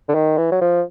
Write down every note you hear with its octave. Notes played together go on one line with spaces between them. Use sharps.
D3
D#3
E3
F#3
F3